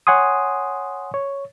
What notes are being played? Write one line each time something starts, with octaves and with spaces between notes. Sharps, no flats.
C#5 F#5 G#5 C6 D#6
C#5